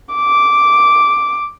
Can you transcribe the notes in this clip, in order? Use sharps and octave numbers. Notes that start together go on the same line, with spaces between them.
D6